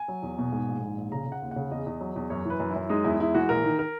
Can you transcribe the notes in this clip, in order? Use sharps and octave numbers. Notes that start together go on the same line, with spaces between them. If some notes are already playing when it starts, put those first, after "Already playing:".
Already playing: G#5
F#3
E2
B2
G#2
A#1
G#2
A#1
C#3 A#5
C#3
F#5
D#2
C#3 F#5
E2 D#5
E2
F#3
E2
F#2 C#5
E3 B4
F#2
E4
F#2
G#3 D#4
E2 E4
G#3 E4
E3 F#4
A#1 A#4
D#3
A#4